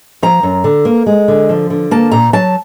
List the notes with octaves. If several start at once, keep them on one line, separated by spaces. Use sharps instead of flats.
F3 A#5
F#2
D3
A#3
G#3
D3
F3
D3
A#3 A5
A#2 A#5
F#3 A5